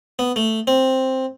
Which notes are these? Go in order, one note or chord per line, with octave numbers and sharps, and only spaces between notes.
B3
A3
C4